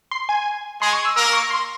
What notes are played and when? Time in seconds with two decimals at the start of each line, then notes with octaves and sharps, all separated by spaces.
0.11 C6
0.29 G#5
0.81 G#3 G#4 C6
0.93 C#6
1.04 E6
1.16 A#3 A#4 E6
1.33 C#6
1.51 C6